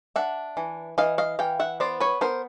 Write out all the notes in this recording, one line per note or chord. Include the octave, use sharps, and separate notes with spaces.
D4 E5 F#5
E3
E3 D#5 F5
D#5 F5
E3 F5 G5
E5 F#5
B3 C5 D5
B4 C#5
B3 A#4 C5